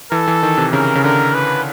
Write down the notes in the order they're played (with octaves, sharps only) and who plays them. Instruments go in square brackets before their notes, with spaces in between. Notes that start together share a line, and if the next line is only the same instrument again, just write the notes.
[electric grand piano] E3 [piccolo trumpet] A4
[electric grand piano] E3
D#3
C3
[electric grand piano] C#3 [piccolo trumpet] A#4
[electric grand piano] C#3
[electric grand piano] D3 [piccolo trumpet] A#4
[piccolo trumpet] B4